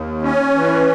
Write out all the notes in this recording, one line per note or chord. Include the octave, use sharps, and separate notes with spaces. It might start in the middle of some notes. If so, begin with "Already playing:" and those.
Already playing: D#2
C#4
E3